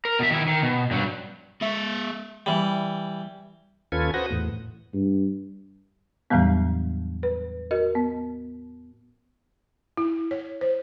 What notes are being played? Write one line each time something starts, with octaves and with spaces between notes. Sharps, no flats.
A#4
B2 E5
D#3 E4
D#3
B2
G2 F#3
G#3 E5
E3 G3
D#2 C#4 F4 A4 B4 G#6
F#4 B4 C5 F#5 D#6 A#6
E2 A2
G2
E2 A2 E3 F#3 G3 B3
B4
F#4 A#4 D#5
B3
E4
C#5
C5